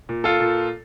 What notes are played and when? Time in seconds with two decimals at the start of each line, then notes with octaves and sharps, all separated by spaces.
0.09 A#2
0.24 F4 A4
0.40 A#2